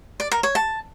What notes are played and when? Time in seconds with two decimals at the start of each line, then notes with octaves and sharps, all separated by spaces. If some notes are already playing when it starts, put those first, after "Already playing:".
0.20 D5
0.32 A#4
0.43 C#5
0.55 A5